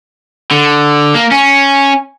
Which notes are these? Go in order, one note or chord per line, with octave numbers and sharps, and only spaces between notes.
D3
A#3
C#4